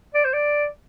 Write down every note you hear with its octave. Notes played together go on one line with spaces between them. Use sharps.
D5
C5
D5